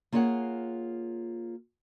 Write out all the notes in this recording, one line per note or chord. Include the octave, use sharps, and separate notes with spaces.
A#3 F4 G#4 C#5 F5 F#5